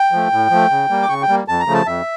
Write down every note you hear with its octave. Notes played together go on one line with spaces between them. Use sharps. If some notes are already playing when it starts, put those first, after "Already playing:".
Already playing: G5
F3 A3
A2
F3 A3
C#3
G3 A#3
D6
C#3 C#6
G5
G3 A#3
F2 A5
A#5
C#3 F3 A3
A5
F2 E5